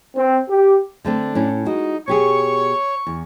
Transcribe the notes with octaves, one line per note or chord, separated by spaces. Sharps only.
C4
G4
D3 A3 C4 D4
A2 C#4
G#3 D#4 F#4
B2 G4 G#4 C#5 C#6
E2